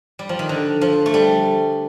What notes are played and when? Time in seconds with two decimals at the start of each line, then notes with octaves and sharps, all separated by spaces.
0.19 G3
0.29 F3
0.39 D#3
0.49 D3
0.81 F3
1.06 A3
1.14 G3